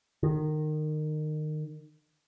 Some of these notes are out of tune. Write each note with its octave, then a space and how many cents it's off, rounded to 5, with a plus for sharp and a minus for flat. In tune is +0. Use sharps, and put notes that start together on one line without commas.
D#3 -25